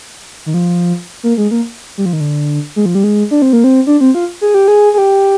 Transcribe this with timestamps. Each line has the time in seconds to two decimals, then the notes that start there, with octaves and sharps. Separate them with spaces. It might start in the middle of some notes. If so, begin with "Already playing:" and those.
0.46 D#3
0.54 F3
1.23 A#3
1.38 G#3
1.51 A#3
1.98 G3
2.06 F3
2.13 D#3
2.20 D3
2.76 G#3
2.86 F3
2.95 G3
3.04 G#3
3.31 D4
3.42 C4
3.53 A#3
3.64 C4
3.87 D4
4.01 C4
4.15 F4
4.41 G#4
4.54 G4
4.68 G#4
4.94 G#4
4.98 G4